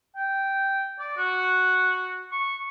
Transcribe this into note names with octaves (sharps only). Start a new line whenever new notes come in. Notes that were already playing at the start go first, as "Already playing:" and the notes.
G5
D5
F#4
C#6